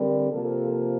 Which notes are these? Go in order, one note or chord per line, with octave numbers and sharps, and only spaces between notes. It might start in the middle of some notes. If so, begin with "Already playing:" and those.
Already playing: D3 G3 C4 A#4
C3 F3 A#3 A4